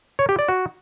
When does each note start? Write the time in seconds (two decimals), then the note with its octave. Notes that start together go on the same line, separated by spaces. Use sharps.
0.19 C#5
0.29 G4
0.39 D5
0.48 F#4